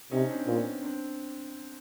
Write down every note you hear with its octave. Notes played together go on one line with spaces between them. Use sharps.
C3 C#4 D#4
C4 D4
A#2 B3 C#4
C4 D4